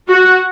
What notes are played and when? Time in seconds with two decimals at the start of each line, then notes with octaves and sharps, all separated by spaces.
0.08 F#4